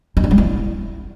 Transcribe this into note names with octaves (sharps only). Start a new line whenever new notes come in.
D#4
D4
G#3
E4